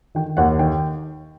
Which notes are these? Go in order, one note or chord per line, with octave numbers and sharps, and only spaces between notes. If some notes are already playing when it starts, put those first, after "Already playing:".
D#3 G5
D#2 F#5
D#3 G5